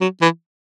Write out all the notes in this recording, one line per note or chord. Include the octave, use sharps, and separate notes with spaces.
F#3
E3